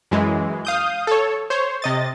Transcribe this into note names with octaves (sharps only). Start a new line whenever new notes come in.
F#2 E3 G#3
F5 D#6 G6
A4 C#5
C5 C#5
C3 D#5 A6